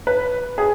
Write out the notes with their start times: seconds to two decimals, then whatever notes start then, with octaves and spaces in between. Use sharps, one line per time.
0.07 B4
0.58 G#4